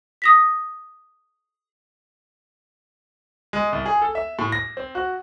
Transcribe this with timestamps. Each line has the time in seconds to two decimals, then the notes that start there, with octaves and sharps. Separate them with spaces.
0.22 D#6 A#6 B6
3.53 G#3
3.73 C2
3.86 G#4
4.02 A4
4.15 E5
4.39 A2
4.52 A#6
4.77 C4
4.95 F#4